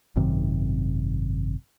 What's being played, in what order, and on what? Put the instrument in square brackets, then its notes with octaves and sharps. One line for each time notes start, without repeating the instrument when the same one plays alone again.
[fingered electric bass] G#1 F#2 C3 D#3